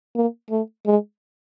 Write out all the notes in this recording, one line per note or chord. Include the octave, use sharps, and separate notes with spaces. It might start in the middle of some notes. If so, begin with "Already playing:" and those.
A#3
A3
G#3